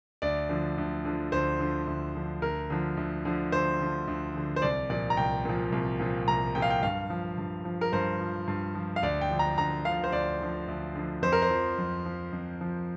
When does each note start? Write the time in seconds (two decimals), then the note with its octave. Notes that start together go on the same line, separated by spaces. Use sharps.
0.22 D2 D5
0.49 D3 F3
0.78 D2
1.05 D3 F3
1.32 D2 C5
1.60 D3 F3
1.87 D2
2.15 D3 F3
2.42 D2 A#4
2.70 D3 F3
2.97 D2
3.25 D3 F3
3.52 D2 C5
3.80 D3 F3
4.08 D2
4.35 D3 F3
4.56 C5
4.62 C2 D5
4.90 A#2 F3 D5
5.10 A#5
5.17 C2 G5
5.45 A#2 F3
5.72 C2
6.00 A#2 F3
6.27 C2 A#5
6.55 A#2 F3 G5
6.62 F5
6.70 G5
6.83 G2 F5
7.10 F3
7.38 G2
7.65 F3
7.81 A#4
7.93 G2 C5
8.21 F3
8.48 G2
8.75 F3
8.96 F5
9.03 D2 D5
9.21 G5
9.30 D3 F3
9.39 A#5
9.58 D2 A#5
9.85 D3 F3 F5
10.04 C5
10.12 D2 D5
10.41 D3 F3
10.68 D2
10.95 D3 F3
11.22 F2 C5
11.32 A#4
11.42 C5
11.50 F3
11.78 F2
12.05 F3
12.33 F2
12.61 F3